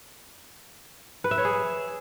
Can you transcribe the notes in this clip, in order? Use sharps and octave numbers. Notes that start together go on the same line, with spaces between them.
B4
E5
C#5
G#4